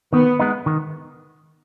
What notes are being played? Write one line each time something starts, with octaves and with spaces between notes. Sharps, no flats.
D#3 B3
G#3 B3 D#4
D#3